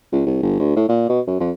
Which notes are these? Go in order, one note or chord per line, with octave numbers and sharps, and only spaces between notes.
C#2
C2
G1
D2
A2
A#2
B2
F#2
F2